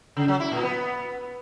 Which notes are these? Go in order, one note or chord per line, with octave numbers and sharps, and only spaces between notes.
C#3
F#3
E4
A#2
B3